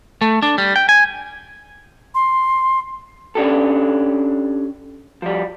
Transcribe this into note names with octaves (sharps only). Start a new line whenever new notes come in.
A3
D4
G3
G5
G#5
C6
C#4 D4 G4 A4
F3 G3